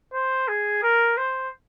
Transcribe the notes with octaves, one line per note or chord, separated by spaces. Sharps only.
C5
G#4
A#4
C5